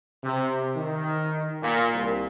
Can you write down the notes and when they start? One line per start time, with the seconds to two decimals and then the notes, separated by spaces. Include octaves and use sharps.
0.23 C3
0.76 D#3
1.62 A#2
1.94 C2